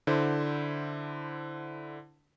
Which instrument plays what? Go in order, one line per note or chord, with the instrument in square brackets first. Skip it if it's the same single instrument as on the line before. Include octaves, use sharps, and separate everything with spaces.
[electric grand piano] D3 E4 C5